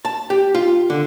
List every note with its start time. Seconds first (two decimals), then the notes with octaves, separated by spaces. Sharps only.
0.05 A5
0.30 G4
0.55 F4
0.90 D3